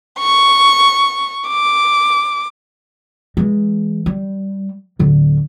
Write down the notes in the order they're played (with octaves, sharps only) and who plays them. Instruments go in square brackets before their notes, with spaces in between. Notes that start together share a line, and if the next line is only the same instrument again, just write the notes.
[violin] C#6
D6
[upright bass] E3 G#3
G3
D1 D3